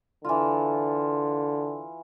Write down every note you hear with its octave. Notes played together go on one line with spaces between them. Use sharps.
D3 E3 F4